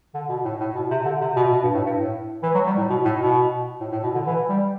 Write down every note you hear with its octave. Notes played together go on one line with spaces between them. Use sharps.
D3
B2
A2
A2
B2
C3
D3
C3
B2
B2
G2
A2
G2
A2
E3
F#3
G3
A2
B2
A2
B2
A2
A2
B2
D3
E3
G3